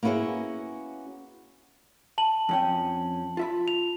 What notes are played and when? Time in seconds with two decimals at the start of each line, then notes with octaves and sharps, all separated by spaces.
0.03 A#3 B3 C#4 E4 F#4 G#4
2.18 A5 F#7
2.49 F2 C#4 G5
3.37 F4 E5 B5
3.68 F7